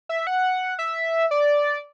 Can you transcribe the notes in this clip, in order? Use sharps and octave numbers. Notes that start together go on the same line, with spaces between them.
E5
F#5
E5
D5